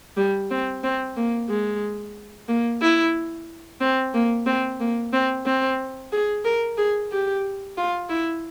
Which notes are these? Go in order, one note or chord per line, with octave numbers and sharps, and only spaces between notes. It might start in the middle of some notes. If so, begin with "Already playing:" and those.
G3
C4
C4
A#3
G#3
A#3
E4
C4
A#3
C4
A#3
C4
C4
G#4
A#4
G#4
G4
F4
E4